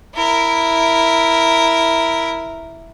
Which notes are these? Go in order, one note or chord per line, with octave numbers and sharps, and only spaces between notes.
E4 A#4